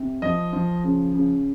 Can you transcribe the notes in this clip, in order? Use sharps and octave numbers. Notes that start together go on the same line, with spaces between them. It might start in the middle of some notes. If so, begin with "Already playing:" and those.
Already playing: C3
F3 D#5
F3
C#3
C#3